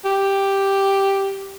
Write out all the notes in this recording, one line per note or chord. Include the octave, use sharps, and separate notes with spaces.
G4